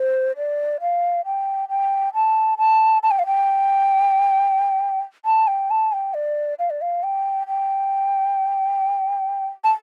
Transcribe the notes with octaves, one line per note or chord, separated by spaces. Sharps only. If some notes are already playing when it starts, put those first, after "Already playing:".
Already playing: C5
D5
F5
G5
G5
A5
A5
A5
G5
F5
G5
A5
G5
A5
G5
D5
F5
D5
F5
G5
G5
A5